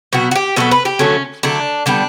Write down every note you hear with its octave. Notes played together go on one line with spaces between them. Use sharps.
B2 F#3 B3 F#4
F#4
G4
B2 F#3 B3 A4
B4
G4
D3 F#3 A3 C#4
D3 F#3 A3 D4
D3 G3 B3 D4